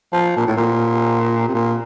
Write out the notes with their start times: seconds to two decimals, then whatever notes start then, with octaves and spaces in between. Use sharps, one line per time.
0.13 F3
0.37 A#2
0.47 A2
0.57 A#2
1.48 C3
1.54 A#2